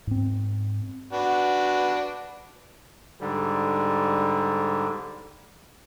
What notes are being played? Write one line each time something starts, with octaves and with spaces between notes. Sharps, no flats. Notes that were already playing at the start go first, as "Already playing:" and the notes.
G#2 C4
D4 F#4 B4
G#2 D3 G3